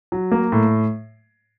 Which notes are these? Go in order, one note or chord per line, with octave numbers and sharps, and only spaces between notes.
F#3
A#3
A2